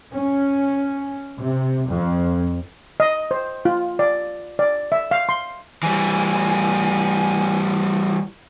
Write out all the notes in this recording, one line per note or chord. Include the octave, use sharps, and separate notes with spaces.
C#4
C3
F2
D#5
C5
F4
D5
D5
E5
F5
C6
E3 G3 G#5